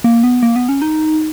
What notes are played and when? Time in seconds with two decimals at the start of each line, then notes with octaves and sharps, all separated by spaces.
0.04 A#3
0.24 B3
0.43 A#3
0.56 B3
0.69 C#4
0.82 D#4